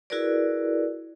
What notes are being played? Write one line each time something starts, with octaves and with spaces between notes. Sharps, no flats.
E4 F#4 G#4 A#4 B4 D5